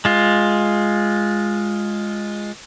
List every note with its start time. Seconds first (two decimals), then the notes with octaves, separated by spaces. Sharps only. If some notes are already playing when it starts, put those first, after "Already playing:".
0.05 G#3 F4